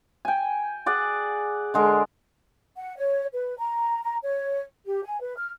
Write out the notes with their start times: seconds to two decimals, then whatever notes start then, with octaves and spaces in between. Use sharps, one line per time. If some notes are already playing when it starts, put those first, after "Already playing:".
0.25 G5 G#5
0.86 G#4 D5 F#5
1.74 D3 G#3 A#4
2.77 F#5
2.97 C#5
3.33 B4
3.58 A#5
4.03 A#5
4.23 C#5
4.86 G4
5.05 G#5
5.21 B4
5.38 F6